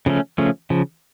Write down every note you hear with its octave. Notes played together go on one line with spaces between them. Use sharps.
C#3 F3 A3 C#4
C#3 F3 A3 C#4
C#3 F3